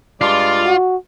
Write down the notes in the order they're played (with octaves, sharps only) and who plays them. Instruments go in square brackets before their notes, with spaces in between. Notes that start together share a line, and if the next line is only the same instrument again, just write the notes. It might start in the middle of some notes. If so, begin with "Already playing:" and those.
[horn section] G2 G#3 D5 [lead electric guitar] F4
[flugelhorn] F#4